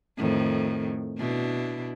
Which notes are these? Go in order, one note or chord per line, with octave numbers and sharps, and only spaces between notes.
F2 A2 D#3
B2 D4 E4